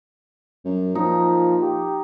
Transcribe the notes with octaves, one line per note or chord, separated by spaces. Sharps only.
F#2
A#2 F3 D#4
G4